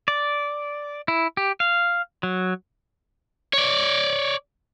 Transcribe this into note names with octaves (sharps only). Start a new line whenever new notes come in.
D5
E4
G4
F5
F#3
C#5 D5